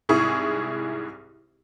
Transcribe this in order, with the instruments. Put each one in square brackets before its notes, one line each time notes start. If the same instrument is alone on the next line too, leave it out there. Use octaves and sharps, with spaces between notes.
[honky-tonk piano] C2 G#2 E4 G#4 C#6 D#6